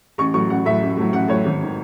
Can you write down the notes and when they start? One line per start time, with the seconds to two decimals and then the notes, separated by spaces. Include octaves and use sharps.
0.18 A1 C#6
0.34 A2 F#3 C#6
0.50 A1 F#5
0.65 A2 F#3 E5
0.82 A1
0.97 A2 F#3
1.13 A1 F#5
1.28 A2 F#3 C#5
1.45 G#1
1.62 D#3